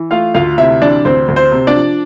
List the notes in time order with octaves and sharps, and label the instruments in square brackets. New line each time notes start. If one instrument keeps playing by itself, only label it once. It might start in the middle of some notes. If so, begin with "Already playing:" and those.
Already playing: [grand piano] E3
A3 F4 F5
D2 F4 F5
C3 E4 E5
E3 D4 D5
D2 C4 C5
D2
C4 C5
C3
D4 D5
F3